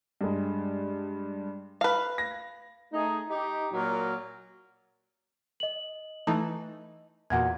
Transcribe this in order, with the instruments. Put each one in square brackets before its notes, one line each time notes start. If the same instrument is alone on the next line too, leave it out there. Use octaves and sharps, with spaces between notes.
[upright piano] G2 G#3
[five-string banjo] B4 F5
[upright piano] A#6
[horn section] A3 D#4 G#4
D#4 G4
A#2 F#3 A#4
[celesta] D#5 F#7
[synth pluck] E3 A3 D#4
[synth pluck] E2 A#2 [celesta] F#4 F#5 G#6